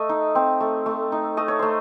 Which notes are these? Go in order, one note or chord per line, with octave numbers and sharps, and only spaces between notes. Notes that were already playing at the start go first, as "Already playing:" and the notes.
Already playing: A3 D#5
D#4
C4
A3
A3
D#4
A3 D#5
C#5
A3 C5